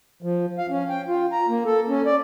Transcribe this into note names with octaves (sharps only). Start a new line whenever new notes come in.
F3
F5
C#4
G5
F4
A#5
A#3
A4
C#4
D5